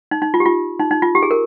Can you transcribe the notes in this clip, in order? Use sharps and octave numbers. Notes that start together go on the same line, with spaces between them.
D#4
D#4
F4
G4
F4
D#4
D#4
F4
G4
G#4
A#4